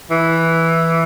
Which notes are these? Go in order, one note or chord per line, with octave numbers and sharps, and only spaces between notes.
E3